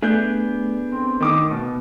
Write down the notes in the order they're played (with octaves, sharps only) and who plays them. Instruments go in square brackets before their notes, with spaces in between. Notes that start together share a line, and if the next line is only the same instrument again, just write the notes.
[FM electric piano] A3 [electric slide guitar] B3 D4 G#4 [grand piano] F#6 G6
[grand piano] C4
D#3 D6 D#6
B2